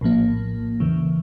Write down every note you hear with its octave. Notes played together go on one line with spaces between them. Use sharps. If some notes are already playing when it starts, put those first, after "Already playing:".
A#1 A2 F3 A#3
E2 C#3 E3